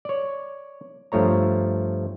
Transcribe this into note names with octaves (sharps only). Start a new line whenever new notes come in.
C#5 D5
G2 F3 A3 C#5 A#5